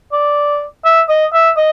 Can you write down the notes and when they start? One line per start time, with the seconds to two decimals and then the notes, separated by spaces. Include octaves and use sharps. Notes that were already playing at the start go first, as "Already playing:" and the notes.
0.13 D5
0.85 E5
1.09 D#5
1.33 E5
1.57 D#5